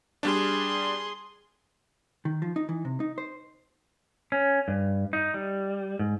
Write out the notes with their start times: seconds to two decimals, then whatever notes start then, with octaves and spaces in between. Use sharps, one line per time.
0.23 G3 D4 G#4 C6
2.25 D#3
2.42 F3
2.56 D#4
2.69 E3
2.85 C3
3.00 D#4
3.18 C5
4.32 C#4
4.68 G2
5.13 D#4
5.34 G3
5.99 G#2